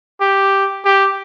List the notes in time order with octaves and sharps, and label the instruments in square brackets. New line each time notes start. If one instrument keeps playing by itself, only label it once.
[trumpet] G4
G4